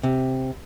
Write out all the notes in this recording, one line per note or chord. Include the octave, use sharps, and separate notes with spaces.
C3